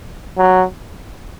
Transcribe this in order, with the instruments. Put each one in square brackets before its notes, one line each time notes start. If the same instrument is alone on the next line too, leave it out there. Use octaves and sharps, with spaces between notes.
[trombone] F#3